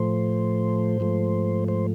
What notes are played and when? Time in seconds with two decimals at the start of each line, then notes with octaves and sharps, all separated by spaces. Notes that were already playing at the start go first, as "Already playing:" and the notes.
Already playing: A2 F3 A3 C5
1.00 G#2 F3 A3
1.68 C5